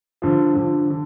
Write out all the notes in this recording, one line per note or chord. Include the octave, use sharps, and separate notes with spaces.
G2 D3 F3
G2 D3 F3
D3